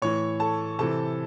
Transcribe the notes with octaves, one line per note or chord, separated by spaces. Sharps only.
A2 E3 C#5 C#6
A4 A5
C3 E3 A4 A5